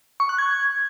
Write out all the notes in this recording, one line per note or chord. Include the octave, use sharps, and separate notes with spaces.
C#6
F#6
G#6